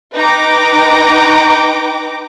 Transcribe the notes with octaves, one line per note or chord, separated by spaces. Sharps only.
D#4 B4 G5 A#5 D6